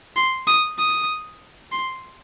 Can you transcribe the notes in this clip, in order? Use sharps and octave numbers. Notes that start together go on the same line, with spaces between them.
C6
D#6
D#6
C6